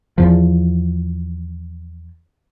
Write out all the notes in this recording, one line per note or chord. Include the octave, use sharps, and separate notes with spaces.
E2 F3